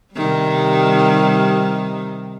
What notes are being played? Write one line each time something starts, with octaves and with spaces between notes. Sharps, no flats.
C3 D#3 G3